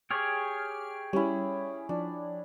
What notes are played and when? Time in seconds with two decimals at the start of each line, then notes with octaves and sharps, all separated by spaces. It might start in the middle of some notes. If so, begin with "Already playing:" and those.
0.10 G4 G#4 C#5 F6
1.13 G3 C#4 E4
1.89 F3 D4